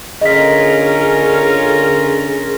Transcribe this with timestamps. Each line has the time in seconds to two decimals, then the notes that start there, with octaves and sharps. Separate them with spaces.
0.21 D3 C#4 F4 G#4 A#4 D#5 B6